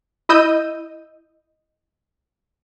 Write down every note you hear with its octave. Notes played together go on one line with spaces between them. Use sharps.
E4 D#5 E6 G6 D#7